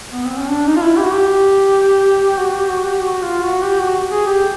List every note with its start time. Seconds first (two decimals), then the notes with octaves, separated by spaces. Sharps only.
0.12 B3
0.25 C4
0.38 C#4
0.50 D4
0.66 D#4
0.76 F4
0.82 E4
0.96 G4
1.04 F#4
1.12 G4
2.38 F#4
2.54 G4
2.69 F#4
2.85 G4
3.00 F#4
3.22 F4
3.43 F#4
3.63 G4
3.79 F#4
4.11 G#4
4.26 G4